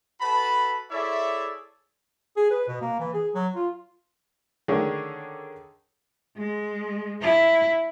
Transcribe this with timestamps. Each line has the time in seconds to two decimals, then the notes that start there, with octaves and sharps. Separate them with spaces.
0.21 F#4 A4 B4 A5 B5
0.91 E4 G#4 A4 C#5 D5 E5
2.36 G#4
2.50 B4
2.68 B2
2.81 A#3
2.99 E3
3.13 G#4
3.34 F#3
3.55 F4
4.68 D3 D#3 C#4 D4 G#4 C#5
6.37 G#3
7.21 E4